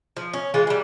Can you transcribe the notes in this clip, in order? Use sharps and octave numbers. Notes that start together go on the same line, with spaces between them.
F3
C#4
E3 G#3 F4
E3 G3